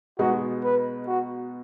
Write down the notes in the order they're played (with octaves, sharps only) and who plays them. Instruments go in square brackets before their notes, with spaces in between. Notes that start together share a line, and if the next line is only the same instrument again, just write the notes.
[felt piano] B2 G#3 B3 D#4 [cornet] F#4
[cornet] B4
F#4